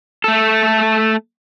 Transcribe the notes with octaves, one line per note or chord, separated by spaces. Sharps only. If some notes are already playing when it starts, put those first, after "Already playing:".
A3 A4